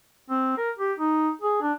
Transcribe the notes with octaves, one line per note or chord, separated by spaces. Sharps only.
C4
A#4
G4
D#4
G#4
D4